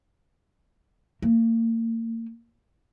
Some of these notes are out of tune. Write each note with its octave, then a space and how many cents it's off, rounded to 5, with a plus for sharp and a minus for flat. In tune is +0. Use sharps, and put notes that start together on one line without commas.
A#3 -35